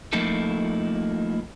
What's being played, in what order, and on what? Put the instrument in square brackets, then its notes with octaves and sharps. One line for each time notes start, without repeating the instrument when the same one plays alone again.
[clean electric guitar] F3 A3 A#3 D#4 E4 A4